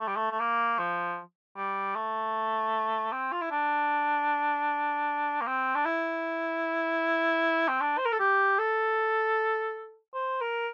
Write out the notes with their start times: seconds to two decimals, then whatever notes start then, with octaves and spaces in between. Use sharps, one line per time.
0.01 A3
0.08 G3
0.16 A3
0.31 A3
0.40 A#3
0.79 F3
1.56 G3
1.95 A3
3.12 C4
3.32 F4
3.41 E4
3.51 D4
5.41 A#3
5.47 C4
5.75 D4
5.85 E4
7.68 C4
7.81 D4
7.98 C5
8.05 A#4
8.12 A4
8.19 G4
8.59 A4
10.14 C5
10.41 A#4